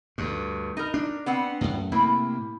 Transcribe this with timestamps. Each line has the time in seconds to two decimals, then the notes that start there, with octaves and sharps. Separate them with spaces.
0.18 D2 G2
0.77 D#4 A#4
0.94 D4
1.26 B3 C4 F#5
1.61 F#2 A2
1.92 A2 C3 A#3 E4